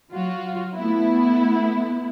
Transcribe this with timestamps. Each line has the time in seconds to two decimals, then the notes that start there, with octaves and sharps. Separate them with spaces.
0.11 F#3 F4 F#4
0.75 A3 B3 E4